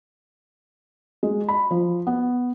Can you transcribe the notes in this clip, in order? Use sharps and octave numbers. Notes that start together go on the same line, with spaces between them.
G#3
B5
F3
B3